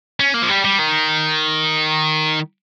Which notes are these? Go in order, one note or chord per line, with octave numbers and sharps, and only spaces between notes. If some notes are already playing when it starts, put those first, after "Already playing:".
C#4
A#3
F3
G3
G3
D#3